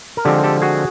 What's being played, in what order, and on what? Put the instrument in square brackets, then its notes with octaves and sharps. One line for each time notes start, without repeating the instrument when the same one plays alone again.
[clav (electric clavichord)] A#4
D3 F3 G#3 C4 G4 A4
G4 A4
F#4 G#4